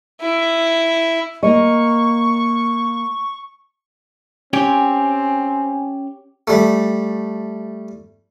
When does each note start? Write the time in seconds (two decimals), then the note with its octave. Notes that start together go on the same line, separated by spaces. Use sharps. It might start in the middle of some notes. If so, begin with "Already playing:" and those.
0.21 E4
1.43 A#3 D#5 C#6
4.53 C4 C#4 G4 C#5 G5 G#5
6.48 G3 A3